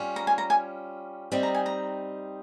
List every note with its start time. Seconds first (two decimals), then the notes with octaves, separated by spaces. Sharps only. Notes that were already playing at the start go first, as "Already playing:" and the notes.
Already playing: G3 C#4 F4
0.16 A#5
0.27 G#5
0.38 A#5
0.50 G#5
1.32 G3 C4 D#4
1.43 A#5
1.55 G#5
1.66 A#5